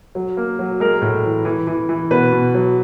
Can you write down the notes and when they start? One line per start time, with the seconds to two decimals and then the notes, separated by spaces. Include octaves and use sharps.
0.15 F#3
0.37 A#3
0.59 F#3
0.80 G#3 A#4
1.02 A2
1.24 E3
1.45 E3
1.67 E3
1.89 E3
2.10 B2 B4
2.32 B2
2.55 F#3